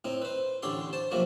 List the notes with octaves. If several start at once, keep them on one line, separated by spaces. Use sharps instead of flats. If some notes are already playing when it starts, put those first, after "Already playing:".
A2 C4 D#4
B4 C5
A1 D3 G4 A4 C#5 C6
C5 A5
C2 C3 F3 F#3 A3 A#3